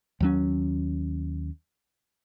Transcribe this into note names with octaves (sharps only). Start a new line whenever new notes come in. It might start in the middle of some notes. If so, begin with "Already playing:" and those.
D#2 F#3 C#4